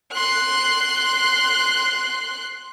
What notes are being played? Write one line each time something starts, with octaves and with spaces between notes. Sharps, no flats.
C6 F#6